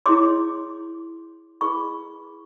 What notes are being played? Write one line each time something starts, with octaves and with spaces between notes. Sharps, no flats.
E4 G#4 C#5 C6 D6
E4 G#4 B4 B5 C#6